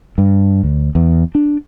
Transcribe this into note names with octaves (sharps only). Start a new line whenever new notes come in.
G2
D2
E2
D4